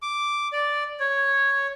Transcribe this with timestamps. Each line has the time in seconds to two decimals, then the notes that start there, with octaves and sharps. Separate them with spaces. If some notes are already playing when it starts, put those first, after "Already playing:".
0.02 D6
0.53 D5
1.00 C#5